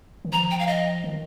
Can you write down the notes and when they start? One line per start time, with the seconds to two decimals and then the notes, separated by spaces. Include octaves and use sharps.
0.25 D#3
0.32 F3 A#5
0.51 G5
0.59 F5
0.67 D#5
1.04 D#3